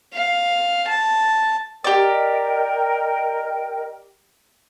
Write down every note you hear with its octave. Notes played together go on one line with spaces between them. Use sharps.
F5
A5
G4 A#4 D5 D#5 G5